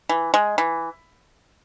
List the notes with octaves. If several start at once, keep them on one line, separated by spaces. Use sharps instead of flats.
E3
G#3
E3